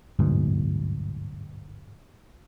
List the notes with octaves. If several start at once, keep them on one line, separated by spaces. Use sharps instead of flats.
D1 G1 G#2 B2